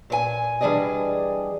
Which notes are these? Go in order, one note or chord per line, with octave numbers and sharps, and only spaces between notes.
A#2 C5 G#5
E3 G3 D4 G#4 D5 D#5